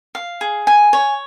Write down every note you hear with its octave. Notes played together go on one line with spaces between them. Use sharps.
F5
G#4
G#5
C#5